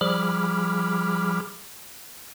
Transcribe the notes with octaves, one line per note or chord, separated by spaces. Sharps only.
F3 G3 G#4 B5 D6 F6